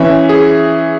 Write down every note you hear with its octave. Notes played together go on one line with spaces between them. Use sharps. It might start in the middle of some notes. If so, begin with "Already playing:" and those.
Already playing: E3 C#4 E5
G#4